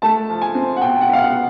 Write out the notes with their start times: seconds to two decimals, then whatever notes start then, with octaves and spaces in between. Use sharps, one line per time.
0.02 A3 A5
0.30 F3
0.42 G#5
0.55 C4
0.76 F#5
0.81 B2 G5
1.01 F#5
1.09 B3 F5
1.22 F#5